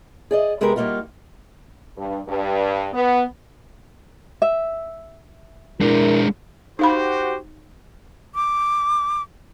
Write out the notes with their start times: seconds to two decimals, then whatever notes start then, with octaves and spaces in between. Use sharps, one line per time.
0.31 G#4 D5 D#5
0.61 C3 G#3 B3 G4 A#4
0.76 G3 A#3 C#4 D#4 F4 F#4
1.98 G2
2.27 G2
2.93 B3
4.42 E5
5.81 G#3 D4 E4 A#4
6.79 D#4 F#4 G4 C5 F5 B5
8.35 D6